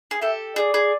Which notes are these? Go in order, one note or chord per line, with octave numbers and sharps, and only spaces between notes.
G#4
G4 A4 E5
G#4 D5
G#4